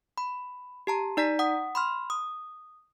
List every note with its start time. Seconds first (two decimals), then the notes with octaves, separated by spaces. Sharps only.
0.18 B5
0.87 G4 A5 A#5
1.17 D#4 D5 A#5 B6
1.39 F#5 D#6
1.75 B5 C6 F6
2.10 D#6